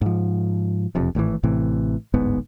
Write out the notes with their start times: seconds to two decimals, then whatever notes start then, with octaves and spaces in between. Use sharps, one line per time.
0.01 G#2 F3
0.95 E1 F2 C3
1.15 G#1 A2 D3 E3
1.43 A1 A2 C3 E3
2.14 D1 G1 G#2 B3